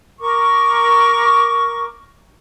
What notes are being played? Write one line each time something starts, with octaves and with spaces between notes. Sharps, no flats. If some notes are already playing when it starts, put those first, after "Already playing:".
A#4 C#6 D6